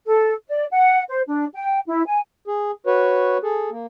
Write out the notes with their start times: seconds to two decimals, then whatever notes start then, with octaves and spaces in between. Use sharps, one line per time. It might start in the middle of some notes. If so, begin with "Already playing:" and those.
0.06 A4
0.48 D5
0.71 F#5
1.09 C5
1.27 D4
1.53 G5
1.87 E4
2.06 G#5
2.47 G#4
2.87 F#4 B4 C#5
3.43 G#4 A4
3.71 A#3